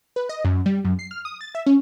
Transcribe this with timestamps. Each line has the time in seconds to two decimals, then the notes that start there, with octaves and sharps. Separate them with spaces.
0.16 B4
0.29 D#5
0.45 F#2
0.66 G3
0.85 F#2
0.99 C7
1.11 F6
1.25 D#6
1.41 A6
1.55 E5
1.66 C#4